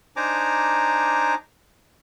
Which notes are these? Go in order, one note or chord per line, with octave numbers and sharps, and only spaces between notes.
D4 D#4 C5 G#5 A#5 D6